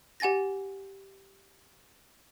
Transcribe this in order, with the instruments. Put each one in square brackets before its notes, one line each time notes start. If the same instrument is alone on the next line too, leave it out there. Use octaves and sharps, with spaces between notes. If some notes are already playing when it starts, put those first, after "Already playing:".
[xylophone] G4 F#5 G#5 A6 A#6